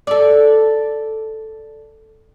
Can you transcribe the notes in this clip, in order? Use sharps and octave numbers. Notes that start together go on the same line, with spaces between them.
A4 D5